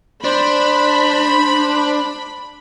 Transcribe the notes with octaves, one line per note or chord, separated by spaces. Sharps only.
D4 C5 B5